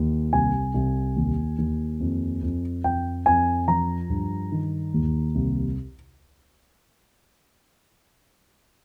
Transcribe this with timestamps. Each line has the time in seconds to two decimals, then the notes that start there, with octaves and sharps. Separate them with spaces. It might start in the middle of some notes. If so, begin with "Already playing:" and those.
Already playing: D#2
0.33 C2 G#5
0.74 C2
1.16 D#2
1.58 D#2
2.00 F2
2.42 F2
2.84 F2 G5
3.26 F2 G#5
3.68 F3 A#5
4.10 G2
4.52 D#3
4.94 D#2
5.35 C2